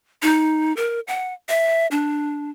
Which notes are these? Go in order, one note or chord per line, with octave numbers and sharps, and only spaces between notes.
D#4
A#4
F#5
E5
D4